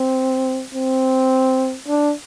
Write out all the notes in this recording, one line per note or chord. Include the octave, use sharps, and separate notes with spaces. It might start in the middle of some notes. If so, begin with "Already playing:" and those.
Already playing: C4
C4
D4